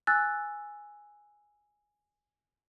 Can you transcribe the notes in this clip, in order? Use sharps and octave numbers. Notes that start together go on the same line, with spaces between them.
G#5 E6 F#6 A6